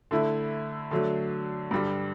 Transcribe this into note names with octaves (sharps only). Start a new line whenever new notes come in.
D3 A3 E4
D3 F#3 A3 D4
G2 D3 G3